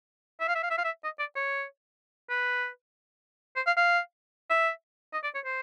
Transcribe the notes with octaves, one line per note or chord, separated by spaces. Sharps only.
E5
F5
E5
F5
E5
F5
E5
D#5
D5
C#5
B4
C5
F5
F5
E5
D#5
D5
C#5
C5